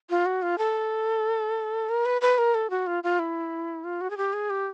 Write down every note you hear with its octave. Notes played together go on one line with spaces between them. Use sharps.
F4
F#4
F4
A4
A#4
B4
B4
A#4
A4
F#4
F4
F4
E4
F4
F#4
G#4
G4
G#4
G4